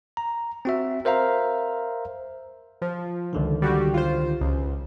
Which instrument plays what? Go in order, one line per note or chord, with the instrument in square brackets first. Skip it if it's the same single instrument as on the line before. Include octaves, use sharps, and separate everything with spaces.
[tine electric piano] A#5
C4 F#4 E5
A#4 C5 E5 F5 A#5
[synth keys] F3
[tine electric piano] C#2 D3 D#3
[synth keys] G3 F#4 G4
F4 C5
C#2